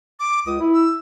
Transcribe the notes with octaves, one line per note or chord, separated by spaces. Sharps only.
D6
C#2 D#6
E4
E6